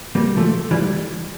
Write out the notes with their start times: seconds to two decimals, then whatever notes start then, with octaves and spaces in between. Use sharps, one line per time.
0.15 G3 A#3
0.37 F3 A3
0.71 E3 G3